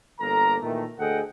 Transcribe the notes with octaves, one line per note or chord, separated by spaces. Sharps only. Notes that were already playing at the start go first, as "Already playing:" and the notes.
G1 A#3 A4 A#4 A#5
A#2 D#3 E3 A3
D2 G#4 A4 D#5 F#5 G5